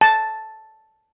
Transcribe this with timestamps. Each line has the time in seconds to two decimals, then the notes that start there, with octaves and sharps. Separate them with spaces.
0.01 A5